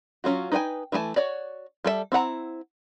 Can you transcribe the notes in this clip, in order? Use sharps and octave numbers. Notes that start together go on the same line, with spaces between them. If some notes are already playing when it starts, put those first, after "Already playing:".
F#3 C#4 F4 F#4
D#4 B4 D5 G5 G#5
E3 A3 G#4 G#5 A5
F#4 C#5 D5
G3 A4 B4 E5
C4 E4 F#5 A#5